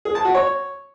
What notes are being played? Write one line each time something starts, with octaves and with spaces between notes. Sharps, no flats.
G#4
A5
F#4
C#5